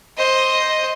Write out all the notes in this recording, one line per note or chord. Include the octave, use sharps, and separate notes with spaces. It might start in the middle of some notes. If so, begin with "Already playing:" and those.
C5 D#5